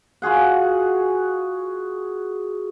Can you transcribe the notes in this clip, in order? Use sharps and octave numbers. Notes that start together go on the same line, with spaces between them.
F4 F#4 G#4 F#5